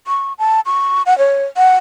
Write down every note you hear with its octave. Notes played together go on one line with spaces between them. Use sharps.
C#6
A5
C#6
F#5
C#5
F#5